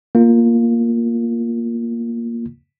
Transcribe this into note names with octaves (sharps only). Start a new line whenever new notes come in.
A#3 F4